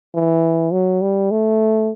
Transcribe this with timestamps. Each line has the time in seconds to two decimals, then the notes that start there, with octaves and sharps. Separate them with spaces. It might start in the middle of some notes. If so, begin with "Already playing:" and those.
0.15 E3
0.72 F#3
1.02 G3
1.31 A3